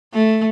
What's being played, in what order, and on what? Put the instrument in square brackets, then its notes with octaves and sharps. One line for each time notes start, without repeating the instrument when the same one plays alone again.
[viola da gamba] A3